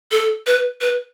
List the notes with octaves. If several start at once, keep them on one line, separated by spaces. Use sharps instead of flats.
A4
B4
B4